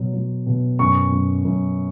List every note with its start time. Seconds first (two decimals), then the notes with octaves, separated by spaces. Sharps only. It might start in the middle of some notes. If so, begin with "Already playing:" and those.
Already playing: B2 F#3
0.14 F#3
0.46 B2
0.79 F#2 C#6
1.12 F#2
1.45 F#2